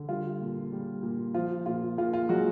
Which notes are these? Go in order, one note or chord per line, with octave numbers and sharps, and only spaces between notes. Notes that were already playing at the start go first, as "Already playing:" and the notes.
Already playing: D3
G3 F4
A#2
G3
A#2
F3 F4
A#2 F4
A#2 F4
F4
F#3 G#3 F#4